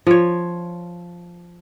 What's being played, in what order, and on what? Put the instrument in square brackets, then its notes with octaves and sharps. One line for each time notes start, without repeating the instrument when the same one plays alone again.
[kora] F3 C#5